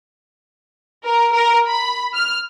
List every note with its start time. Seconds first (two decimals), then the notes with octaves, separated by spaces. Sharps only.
1.04 A#4
1.33 A#4
1.68 B5
2.14 F6